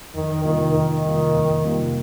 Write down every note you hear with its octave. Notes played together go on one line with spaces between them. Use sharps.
F2 D#3
C3 D#3 G3 A#3 F4
F2 D#3
C3 G3 A#3 F4
F2
C3 G3 A#3 F4